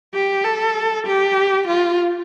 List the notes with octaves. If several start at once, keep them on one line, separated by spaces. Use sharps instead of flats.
G4
A4
G4
F4